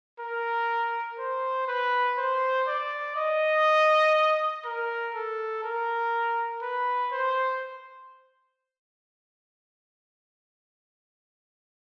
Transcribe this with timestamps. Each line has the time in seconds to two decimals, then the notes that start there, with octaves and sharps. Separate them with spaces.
0.19 A#4
1.19 C5
1.68 B4
2.18 C5
2.68 D5
3.16 D#5
4.65 A#4
5.15 A4
5.64 A#4
6.62 B4
7.12 C5